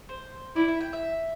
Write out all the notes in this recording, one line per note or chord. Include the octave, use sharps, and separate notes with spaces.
C5
E4 D5
E5
G5
E5